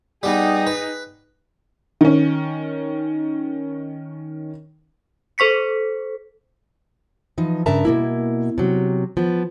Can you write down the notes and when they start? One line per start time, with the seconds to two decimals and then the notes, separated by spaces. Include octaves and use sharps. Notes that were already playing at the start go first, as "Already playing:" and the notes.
0.23 G3 B3 D#4 G#4
0.67 B4
2.01 D#3 C#4
5.38 A4 C5 C#6 B6 C#7
7.38 E3 F3 D#4
7.66 G2 C#3 A#4 E5 A5 A#5
7.85 B2 A#3 E4
8.58 C3 F#3
9.17 F3 B3